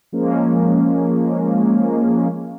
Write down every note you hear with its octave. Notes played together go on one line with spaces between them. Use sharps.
F3 G#3 A#3 C#4